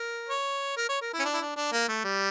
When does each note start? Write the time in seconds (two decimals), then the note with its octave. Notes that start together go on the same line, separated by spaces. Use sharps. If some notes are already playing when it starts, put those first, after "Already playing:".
Already playing: A#4
0.29 C#5
0.77 A#4
0.89 C#5
1.01 A#4
1.13 E4
1.20 C#4
1.25 D4
1.34 E4
1.41 D4
1.57 D4
1.72 A#3
1.89 A3
2.04 G3